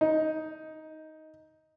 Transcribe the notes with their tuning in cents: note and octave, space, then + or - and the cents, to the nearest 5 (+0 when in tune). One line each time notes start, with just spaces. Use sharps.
D#4 +10